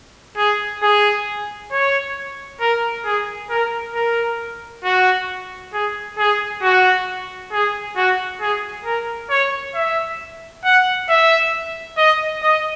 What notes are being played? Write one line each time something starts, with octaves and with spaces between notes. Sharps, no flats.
G#4
G#4
C#5
A#4
G#4
A#4
A#4
F#4
G#4
G#4
F#4
G#4
F#4
G#4
A#4
C#5
E5
F#5
E5
D#5
D#5